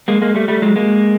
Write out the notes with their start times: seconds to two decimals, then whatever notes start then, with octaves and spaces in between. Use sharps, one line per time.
0.08 G#3 A#3
0.22 G#3 A#3
0.35 G3 A3
0.48 G3 A3
0.62 F#3 G#3
0.76 G#3 A#3